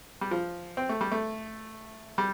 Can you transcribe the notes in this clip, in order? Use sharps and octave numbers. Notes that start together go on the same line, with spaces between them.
G3
F3
C4
A3
G3
A3
G3